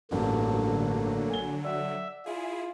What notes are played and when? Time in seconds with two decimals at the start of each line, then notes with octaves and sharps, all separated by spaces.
0.11 A1 G2 D3 F#3 A3 A#3
1.30 G#5 G7
1.65 D5 E5 F#5
2.26 E4 F4 G#4